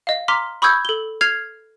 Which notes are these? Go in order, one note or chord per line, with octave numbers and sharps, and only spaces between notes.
D#5 F5
A#5 C6 D6 F6 B6
B5 C#6 D#6 E6 G6 G#6
A4 G7
F6 G#6 C7 F7